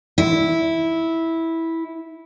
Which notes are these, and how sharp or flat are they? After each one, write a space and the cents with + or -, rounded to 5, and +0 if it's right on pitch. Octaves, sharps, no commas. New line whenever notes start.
E4 -10